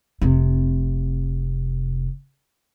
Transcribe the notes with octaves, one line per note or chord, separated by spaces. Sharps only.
F1 C3